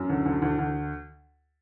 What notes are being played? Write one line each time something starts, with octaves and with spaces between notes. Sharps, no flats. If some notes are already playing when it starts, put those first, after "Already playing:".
Already playing: F#2
D2
D2
D2
D2